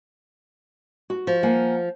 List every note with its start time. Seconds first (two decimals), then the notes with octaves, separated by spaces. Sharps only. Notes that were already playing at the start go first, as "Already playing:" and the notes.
1.10 F#4
1.27 F3
1.43 A#3 F#5 G#5